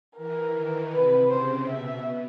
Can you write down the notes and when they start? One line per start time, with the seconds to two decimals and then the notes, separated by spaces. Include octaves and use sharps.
0.17 E3 A#4
0.55 D#3
0.93 C3 B4
1.30 C#3 C5
1.69 B2 E5